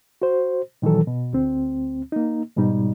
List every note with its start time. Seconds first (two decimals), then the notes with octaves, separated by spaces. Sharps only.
0.22 F#4 C5
0.82 A#2 D#3 E3 F#3 A4
1.07 B2
1.33 D2 C4
2.12 A#3 D#4
2.57 G#2 B2 G3 D#4